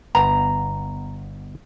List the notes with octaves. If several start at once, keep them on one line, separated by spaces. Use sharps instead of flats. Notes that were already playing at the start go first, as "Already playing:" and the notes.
G1 B3 B4 A#5